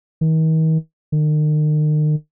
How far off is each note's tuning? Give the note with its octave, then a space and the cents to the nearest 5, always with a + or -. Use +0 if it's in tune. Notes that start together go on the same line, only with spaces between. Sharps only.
D#3 +40
D#3 -40